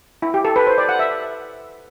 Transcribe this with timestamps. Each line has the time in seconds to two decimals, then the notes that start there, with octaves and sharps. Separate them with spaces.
0.22 E4
0.34 G4
0.45 A4
0.56 B4
0.67 C5
0.78 D5
0.89 F#5
0.99 E5